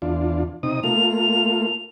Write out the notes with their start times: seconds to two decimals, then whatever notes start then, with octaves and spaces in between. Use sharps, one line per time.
0.02 E2 D4 F4
0.63 C3 D#4 D#6
0.84 A3 A#3 F4 F7